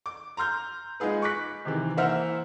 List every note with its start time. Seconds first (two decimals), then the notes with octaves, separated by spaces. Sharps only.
0.06 D6
0.37 A#5 C6 F6 G6
1.00 G#3 D#4 F4 G#4 B4
1.22 C#6 D6 F#6 B6
1.65 C3 D#3 E3
1.97 E3 A#3 C5 E5 F#5 F6